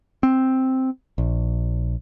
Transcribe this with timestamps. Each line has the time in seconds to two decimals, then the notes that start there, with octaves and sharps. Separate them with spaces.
0.23 C4
1.18 A#1